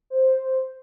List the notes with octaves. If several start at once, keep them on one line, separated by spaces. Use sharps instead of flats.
C5